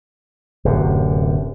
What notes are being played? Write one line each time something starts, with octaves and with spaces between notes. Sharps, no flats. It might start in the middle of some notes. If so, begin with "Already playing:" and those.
D1 F#2 C3